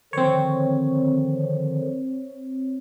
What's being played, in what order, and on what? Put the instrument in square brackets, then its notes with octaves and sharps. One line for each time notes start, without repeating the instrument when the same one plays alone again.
[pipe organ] D3 D#3 F3 [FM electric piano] C4 C#5